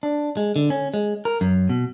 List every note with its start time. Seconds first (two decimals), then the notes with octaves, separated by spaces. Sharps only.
0.03 D4
0.37 G#3
0.56 D3
0.70 C#4
0.94 G#3
1.25 A#4
1.41 F#2
1.69 B2